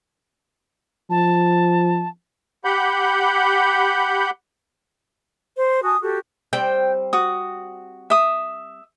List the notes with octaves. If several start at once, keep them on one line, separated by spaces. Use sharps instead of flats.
F3 A5
G4 F#5 B5 G6
C5
F#4 G#5 A5 D#6
F#4 G4 A4
G3 C4 G5
F#4 D#6
E5 D#6